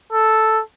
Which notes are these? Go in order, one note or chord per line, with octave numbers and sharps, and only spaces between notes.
A4